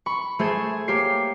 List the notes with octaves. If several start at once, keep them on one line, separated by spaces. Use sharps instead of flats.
B5 C#6
A3 G#4 C5 G#6 E7
A#3 G4 C#5 C7